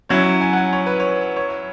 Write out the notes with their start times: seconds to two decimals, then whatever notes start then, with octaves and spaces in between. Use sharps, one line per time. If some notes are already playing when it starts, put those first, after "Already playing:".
0.09 F#3 C#4 E4 C#5
0.41 G#5
0.53 F#5
0.57 G#5
0.73 C#5
0.86 B4
1.00 C#5
1.36 C#5